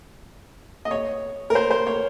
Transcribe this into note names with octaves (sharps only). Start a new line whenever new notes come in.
D#5
C#5
A#4
C5
C5
C#5